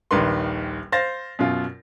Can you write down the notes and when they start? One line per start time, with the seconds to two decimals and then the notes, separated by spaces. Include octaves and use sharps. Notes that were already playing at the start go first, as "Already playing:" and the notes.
0.11 D#1 A#1 D#3 B4 C6
0.92 C5 F5 A6 A#6
1.39 F#2 B2 F4